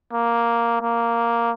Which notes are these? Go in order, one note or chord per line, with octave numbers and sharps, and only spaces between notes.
A#3
A#3